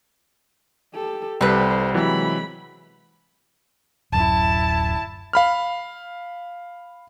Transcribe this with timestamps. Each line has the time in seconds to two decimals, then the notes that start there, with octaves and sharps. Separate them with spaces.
0.94 G4 A4
1.41 C2 G3 C4 A4 B4 C5
1.94 C3 E3 F#3 G#3 B5
4.12 D1 F#2 E4 A5
5.33 F5 B5 F6